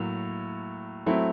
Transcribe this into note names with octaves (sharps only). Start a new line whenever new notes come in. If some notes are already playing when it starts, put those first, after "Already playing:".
Already playing: A2 F#3 A#3
F#3 A3 C4 E4